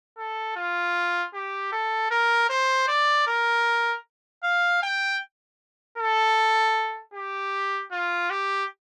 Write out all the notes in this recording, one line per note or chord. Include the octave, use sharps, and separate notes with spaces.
A4
F4
G4
A4
A#4
C5
D5
A#4
F5
G5
A4
G4
F4
G4